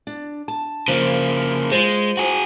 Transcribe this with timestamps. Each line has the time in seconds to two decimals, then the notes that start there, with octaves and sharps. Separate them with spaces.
0.07 D4
0.48 A5
0.88 C#3 F3 A#3
1.72 G#3 F4 C5
2.17 F#4 G#4